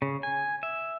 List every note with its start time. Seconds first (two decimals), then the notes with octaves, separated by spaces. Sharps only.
0.02 C#3
0.23 G#5
0.63 E5